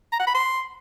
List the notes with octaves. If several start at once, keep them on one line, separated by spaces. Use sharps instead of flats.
A#5
F#5
B5
C6